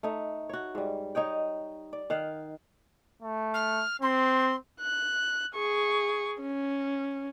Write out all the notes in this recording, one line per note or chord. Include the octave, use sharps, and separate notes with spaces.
A3 D#4
F#4 C#5
G#2 G3
D#4 C#5 D#5 G5
D5
D#3 F5 F#5
A3
F6
C4 C6
F#6
G#4 C#6
C#4